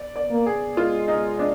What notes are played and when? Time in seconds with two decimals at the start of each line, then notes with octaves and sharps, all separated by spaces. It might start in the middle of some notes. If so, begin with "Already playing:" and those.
Already playing: D5
0.16 D5
0.31 A#3
0.46 G#4
0.77 G#3 F4
1.08 D#4
1.39 D4